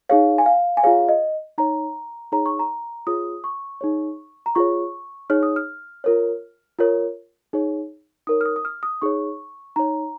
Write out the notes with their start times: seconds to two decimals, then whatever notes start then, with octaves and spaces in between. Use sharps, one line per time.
0.09 D#4 G#4 C#5 F5
0.38 G#5
0.46 F5
0.77 G#5
0.84 F4 G#4 C#5 F5
1.09 D#5
1.58 D#4 C#5 A#5
2.32 D#4 G#4 C#5 A#5
2.46 C#6
2.59 A#5
3.07 F4 G#4 C#5 D#6
3.44 C#6
3.81 D#4 G#4 C#5
4.46 A#5
4.55 F4 G#4 C#5 C#6
5.30 D#4 G#4 C#5 F6
5.43 D#6
5.56 F6
6.04 F4 A#4 C#5
6.79 F4 A#4 C#5
7.53 D#4 G#4 C#5
8.27 D#4 A#4 C#5 D#6
8.41 F6
8.45 D#6
8.56 D#6
8.65 F6
8.83 D#6
9.02 D#4 G#4 C#5 C#6
9.76 D#4 C#5 A#5